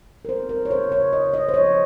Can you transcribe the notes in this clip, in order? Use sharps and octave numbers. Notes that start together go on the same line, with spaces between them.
A#4
C4 C5
A#4
C#5
C#3 C5
C#5
C#3 D#5
D#5
C5
F3 C#5